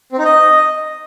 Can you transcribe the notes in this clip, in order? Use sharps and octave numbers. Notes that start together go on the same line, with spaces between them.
C4
D#4
D#5